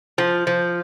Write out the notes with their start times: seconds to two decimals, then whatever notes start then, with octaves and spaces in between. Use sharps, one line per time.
0.18 F3
0.47 F3